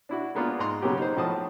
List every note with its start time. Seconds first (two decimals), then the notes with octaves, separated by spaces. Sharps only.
0.09 D4 E4 F#4
0.35 G#3 A#3 B3 D4 F4
0.59 G#2 D#4 A#5 C6
0.82 C#3 F#3 A#3 B3 C#4 G4
0.98 D#4 C5
1.17 A2 F3 F#4 A5 B5 D#6